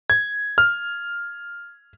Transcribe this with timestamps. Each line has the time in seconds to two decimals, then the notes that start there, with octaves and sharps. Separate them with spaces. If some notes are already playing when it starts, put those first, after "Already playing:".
0.10 G#6
0.58 F6